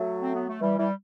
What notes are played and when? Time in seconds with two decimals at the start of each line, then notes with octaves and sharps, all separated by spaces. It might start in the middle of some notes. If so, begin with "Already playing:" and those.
Already playing: F#3 A3
0.21 C4
0.34 B3
0.48 A3
0.61 E3 G3
0.78 E3 G3